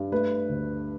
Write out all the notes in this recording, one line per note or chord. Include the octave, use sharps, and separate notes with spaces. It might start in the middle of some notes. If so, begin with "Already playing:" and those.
Already playing: G2
A3 B4
D2